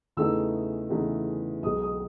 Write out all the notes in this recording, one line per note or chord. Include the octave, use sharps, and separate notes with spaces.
E2 C#3 E3 A3 D#4 E6
E2 C#3 E3 A3 D#4
B1 B2 G#3 D#6
D#6